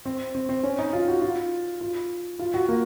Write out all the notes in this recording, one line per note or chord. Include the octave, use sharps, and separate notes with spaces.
C4
C4
C4
C#4
D#4
F4
F#4
F4
F4
F4
F#4
A#3